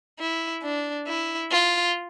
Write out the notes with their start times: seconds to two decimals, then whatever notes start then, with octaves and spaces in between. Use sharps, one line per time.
0.19 E4
0.63 D4
1.07 E4
1.51 F4